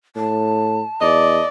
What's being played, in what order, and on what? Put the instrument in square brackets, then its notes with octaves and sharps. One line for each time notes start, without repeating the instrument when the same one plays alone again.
[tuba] A2 [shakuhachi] A5
[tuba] E2 [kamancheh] D5 [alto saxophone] D#5